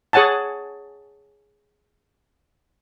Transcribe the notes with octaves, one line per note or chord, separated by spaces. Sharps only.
G#4 C#5 F#5 G#5 A5